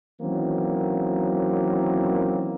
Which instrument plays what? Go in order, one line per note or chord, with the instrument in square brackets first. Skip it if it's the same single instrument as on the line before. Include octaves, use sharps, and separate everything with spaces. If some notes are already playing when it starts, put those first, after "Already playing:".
[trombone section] D#3 E3 F#3 A#3 C4 C#4